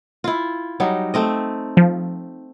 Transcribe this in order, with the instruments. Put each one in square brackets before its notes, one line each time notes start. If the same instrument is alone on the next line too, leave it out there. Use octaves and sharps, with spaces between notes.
[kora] E4 F4
F#3 G3 D#4
A3 C4 D#5
[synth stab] F3